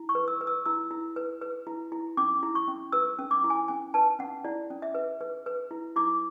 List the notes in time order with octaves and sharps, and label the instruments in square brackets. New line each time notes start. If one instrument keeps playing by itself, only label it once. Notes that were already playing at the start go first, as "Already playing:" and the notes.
Already playing: [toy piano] E4
C#6
B4
E6
B4
E6
E4 E6
E4
B4
B4
E4
E4
C#4 D6
E4
C#6
C#4
B4 E6
C#4
D6
E4
G#5
C#4 G#5
B4 A5
C#4 F#5
E4 D5
C#4
E5
B4
B4
B4
E4
E4 D6